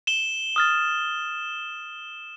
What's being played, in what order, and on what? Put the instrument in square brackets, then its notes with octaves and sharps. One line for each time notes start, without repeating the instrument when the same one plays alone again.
[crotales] E7 G7
[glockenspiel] D#6 F6 A6